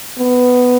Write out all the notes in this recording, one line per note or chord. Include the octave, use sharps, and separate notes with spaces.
B3